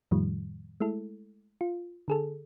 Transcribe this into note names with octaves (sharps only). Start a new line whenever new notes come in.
F2 A2 D#3 F3 G3
G#3 A3 E4 A4
F4
D3 G#4 A4